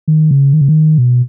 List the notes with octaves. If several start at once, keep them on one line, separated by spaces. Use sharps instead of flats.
D#3
C#3
D#3
C#3
D#3
B2